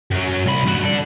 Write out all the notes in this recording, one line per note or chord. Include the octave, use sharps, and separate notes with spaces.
F#2 F#3
C2 B5
G2 F#4
A4 D5